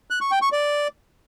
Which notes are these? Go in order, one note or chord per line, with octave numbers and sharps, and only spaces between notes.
F#6
C#6
G5
C#6
D5